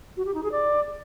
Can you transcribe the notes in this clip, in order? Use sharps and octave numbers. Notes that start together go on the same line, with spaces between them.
F#4
G4
D#4
G#4
D5